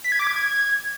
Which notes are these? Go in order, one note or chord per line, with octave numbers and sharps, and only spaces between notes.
B6
G#6
D6
G#6